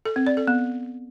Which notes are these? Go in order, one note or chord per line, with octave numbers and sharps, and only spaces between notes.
A4
C4
D5
A4
B3